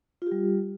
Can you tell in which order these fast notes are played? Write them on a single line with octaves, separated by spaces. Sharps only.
F4 G4 G3